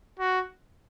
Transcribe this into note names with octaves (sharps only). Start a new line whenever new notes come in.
F#4